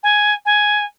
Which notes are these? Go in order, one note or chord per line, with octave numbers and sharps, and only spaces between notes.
G#5
G#5